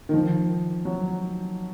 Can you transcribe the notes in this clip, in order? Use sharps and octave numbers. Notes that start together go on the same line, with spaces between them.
D#3
F3
F#3